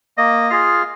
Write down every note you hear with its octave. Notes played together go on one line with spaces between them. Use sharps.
A#3 D#5
F4 G#4 F5